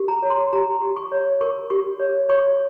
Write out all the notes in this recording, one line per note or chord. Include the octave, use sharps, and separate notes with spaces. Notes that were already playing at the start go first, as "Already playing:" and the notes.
Already playing: G4 A#4
A#5
C#5
C6
G4 A#5
G4
C#6
C#5
A#4 C#6
G4 C#6
C#5
C#5 C#6